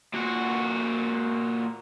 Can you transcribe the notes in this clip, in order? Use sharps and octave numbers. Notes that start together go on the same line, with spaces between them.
A#2 F#4